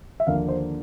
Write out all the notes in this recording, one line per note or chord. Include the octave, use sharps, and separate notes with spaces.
E5
D#2 D3 F3 A#3 F5
C5